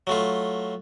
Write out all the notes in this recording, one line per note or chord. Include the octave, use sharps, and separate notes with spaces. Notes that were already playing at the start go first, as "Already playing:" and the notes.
F#3 A3 F4